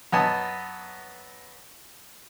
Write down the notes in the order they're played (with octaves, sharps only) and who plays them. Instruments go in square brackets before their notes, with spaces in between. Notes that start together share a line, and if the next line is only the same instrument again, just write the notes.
[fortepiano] F#2 B3 D#5 G#5 A5